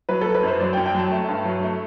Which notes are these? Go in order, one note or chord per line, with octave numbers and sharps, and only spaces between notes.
F#3 B4
F#3 A4
B4
F#2 C5
F#3 D5
G5
F#2
G5
F#3 A5
A3
G2
F#3
A3